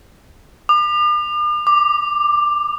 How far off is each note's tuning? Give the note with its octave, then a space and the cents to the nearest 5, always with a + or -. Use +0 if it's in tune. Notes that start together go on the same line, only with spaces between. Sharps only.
D6 +45
D6 +10